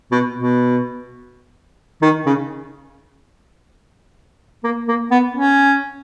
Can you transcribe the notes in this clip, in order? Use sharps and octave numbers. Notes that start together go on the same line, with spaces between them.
B2
B2
D#3
C#3
A#3
A#3
B3
C#4